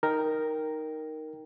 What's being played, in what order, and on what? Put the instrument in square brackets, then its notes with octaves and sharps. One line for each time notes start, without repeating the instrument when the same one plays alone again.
[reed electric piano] D#4 A#4 G5